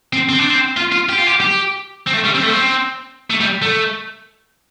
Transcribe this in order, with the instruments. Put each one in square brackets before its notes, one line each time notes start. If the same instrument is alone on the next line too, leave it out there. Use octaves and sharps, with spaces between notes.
[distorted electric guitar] C4
C4
D4
C4
F4
F4
G4
F4
G4
G4
C4
A3
G3
C4
A3
C4
A3
G3
A3